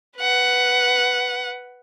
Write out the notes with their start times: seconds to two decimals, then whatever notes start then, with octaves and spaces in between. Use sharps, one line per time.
0.18 B4 F#5